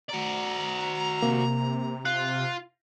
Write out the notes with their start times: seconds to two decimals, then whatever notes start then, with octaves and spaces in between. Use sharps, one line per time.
0.10 F#4 D5 A#5
1.22 C3 A#3
2.05 F4 F#6